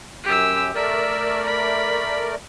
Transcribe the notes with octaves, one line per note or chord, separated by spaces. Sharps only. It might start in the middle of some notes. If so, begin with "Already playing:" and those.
F#2 G4 E6
A3 A#4 D5 E5
B5